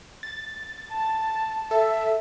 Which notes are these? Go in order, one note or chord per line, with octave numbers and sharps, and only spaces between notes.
A6
A5
A4 E5